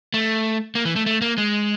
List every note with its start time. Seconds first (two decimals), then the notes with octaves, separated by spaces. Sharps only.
0.14 A3
0.75 A#3
0.85 E3
0.96 A3
1.06 A3
1.22 A#3
1.38 G#3